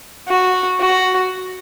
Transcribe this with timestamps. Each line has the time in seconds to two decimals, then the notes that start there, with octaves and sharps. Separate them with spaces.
0.28 F#4
0.80 F#4